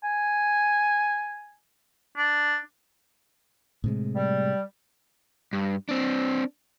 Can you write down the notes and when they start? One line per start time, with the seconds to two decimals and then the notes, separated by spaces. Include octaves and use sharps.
0.04 G#5
2.17 D4
3.84 A2 C3 G#3
4.15 G3
5.53 G2
5.89 C4 D4